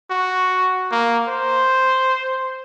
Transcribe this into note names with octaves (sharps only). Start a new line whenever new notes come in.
F#4
A#3
C5